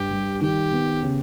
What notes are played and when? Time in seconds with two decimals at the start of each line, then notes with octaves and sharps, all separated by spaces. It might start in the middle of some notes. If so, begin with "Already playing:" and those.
Already playing: G2 G4
0.11 G3
0.41 D#3 G4
0.72 B3
1.03 C#3